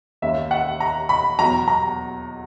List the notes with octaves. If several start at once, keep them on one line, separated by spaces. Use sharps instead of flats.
D#2 D#3 A#3 C#4 E5
F#5
A#5
B5
E2 B2 F#3 A#5
A#5